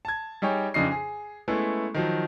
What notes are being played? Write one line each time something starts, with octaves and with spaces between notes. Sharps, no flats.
A5 G#6
G3 D#4 G#4 C#5 G5
F2 C#3 D4 D#4 D#5 C7
G#4
G#3 A3 B3 C#4 E4
D#3 F3 F#3